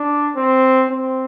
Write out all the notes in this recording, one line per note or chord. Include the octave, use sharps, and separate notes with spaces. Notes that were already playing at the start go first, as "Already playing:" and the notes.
Already playing: D4
C4
C4